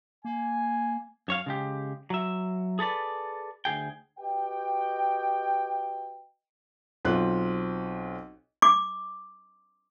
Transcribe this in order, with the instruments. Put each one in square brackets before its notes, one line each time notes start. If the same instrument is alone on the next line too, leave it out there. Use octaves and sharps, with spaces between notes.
[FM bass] A#3 [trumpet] G#5
[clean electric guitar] F#2 C#5 F5
C#3 G#3 G4
F#3 E5
G#4 A4 B4 D5
D2 C3 G#4 G5
[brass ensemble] F#4 G4 B4 D#5 G5
[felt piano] B1 C4 F4 F#6
[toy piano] D6